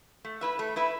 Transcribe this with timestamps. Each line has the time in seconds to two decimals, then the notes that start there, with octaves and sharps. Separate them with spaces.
0.25 A3
0.41 E4 B4 E5
0.59 A3
0.76 E4 B4 E5